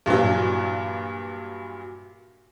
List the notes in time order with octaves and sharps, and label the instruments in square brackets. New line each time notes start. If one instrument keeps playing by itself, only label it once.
[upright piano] G2 A#2 E3 F#3